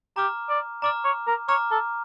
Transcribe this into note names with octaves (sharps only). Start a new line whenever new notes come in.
G4 A#5 D6 F6
D5
D5 A#5 D6 F6
C#5
A#4
C#5 A#5 D6 F6
A4